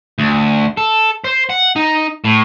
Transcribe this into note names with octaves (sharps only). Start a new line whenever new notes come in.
D2
A4
C5
F#5
D#4
A2